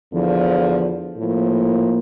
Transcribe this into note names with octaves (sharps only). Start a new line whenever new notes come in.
E2 D3 F3
A2 F3 A#3